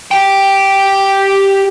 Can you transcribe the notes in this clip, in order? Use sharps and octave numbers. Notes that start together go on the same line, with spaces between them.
G4 G5